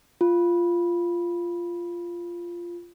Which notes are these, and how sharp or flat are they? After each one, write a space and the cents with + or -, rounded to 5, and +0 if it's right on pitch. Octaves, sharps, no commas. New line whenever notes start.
F4 -10